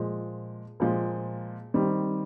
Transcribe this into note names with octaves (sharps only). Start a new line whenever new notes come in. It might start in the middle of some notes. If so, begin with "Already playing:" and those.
Already playing: A#2 F3 G#3
A#2 F3 G#3
D#3 G3 C4